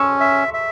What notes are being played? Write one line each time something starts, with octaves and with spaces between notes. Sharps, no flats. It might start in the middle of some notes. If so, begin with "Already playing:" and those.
Already playing: C#4 C#6 E6
E5
E5